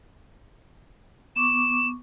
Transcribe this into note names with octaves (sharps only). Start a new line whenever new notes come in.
B3 C#6 D6 E7